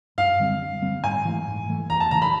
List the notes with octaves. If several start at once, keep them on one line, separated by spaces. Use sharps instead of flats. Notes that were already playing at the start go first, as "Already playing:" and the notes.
G2 F5
D3 G3 C4
G2
D3 G3 C4
G#2 G#5
E3 A3
G#2
E3 A3
E2 A#5
A5
C#3 E3 A3 A#5
B5